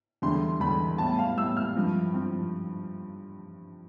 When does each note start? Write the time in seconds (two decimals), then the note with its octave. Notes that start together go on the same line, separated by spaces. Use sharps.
0.22 E2 D3 G3 D4 C6
0.60 E2 D3 G3 D4 B5
0.98 A2 G3 B3 A5
1.19 F5
1.37 A2 G3 B3 E6
1.57 F6
1.76 G2 F3 C4
2.14 F3 C4